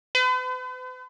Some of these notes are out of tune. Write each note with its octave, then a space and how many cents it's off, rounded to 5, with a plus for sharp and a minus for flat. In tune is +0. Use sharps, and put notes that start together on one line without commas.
B4 +45